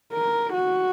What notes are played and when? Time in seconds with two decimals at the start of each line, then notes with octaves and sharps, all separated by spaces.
0.14 A#4
0.54 F#4